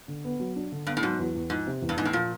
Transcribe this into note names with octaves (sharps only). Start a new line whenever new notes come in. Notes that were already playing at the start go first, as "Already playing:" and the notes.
D3
B3
F#3
D4
D3
G2 B3
A2
G#2 F#3
E2
E2
G#2 F3
C3
E2
G2
E2 G#2
A2
A#2 F3